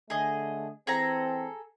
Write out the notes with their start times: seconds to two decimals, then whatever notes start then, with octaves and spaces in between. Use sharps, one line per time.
0.10 D3 A3 G#4 D#5
0.87 E3 C4 G#4 A4 A#5